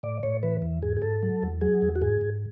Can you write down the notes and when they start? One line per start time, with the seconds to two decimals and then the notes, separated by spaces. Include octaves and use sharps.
0.03 A2 D5
0.23 A2 C#5
0.43 E3 B4
0.62 E2
0.82 G#2 G#4
0.97 G#4
1.02 G#2 A4
1.23 F#3
1.43 E2
1.61 F#3 G#4
1.82 E2
1.96 F#4
2.02 G#2 G#4
2.21 G#2